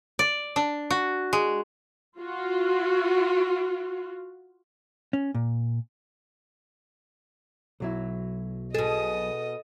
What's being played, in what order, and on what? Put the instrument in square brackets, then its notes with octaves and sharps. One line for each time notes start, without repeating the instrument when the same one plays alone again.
[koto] D5
D4
F#4
G#3
[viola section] F4 F#4
[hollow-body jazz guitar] C#4
A#2
B1 F#3 E4
[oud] B2 G#4 [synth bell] A4 [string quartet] D#5 D#6